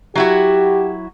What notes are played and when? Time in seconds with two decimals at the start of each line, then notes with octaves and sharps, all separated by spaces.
0.15 F#3 E4 F#4 G4